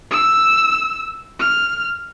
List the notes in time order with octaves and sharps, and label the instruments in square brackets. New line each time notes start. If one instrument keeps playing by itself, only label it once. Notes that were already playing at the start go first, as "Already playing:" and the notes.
[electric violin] E6
F6